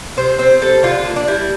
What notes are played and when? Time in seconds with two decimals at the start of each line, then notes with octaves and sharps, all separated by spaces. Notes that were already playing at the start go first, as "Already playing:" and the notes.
0.17 C3 C5
0.38 C4 C5
0.61 G3 A4
0.83 D3 F4
1.05 A#3 D4
1.16 D4
1.28 G3 E4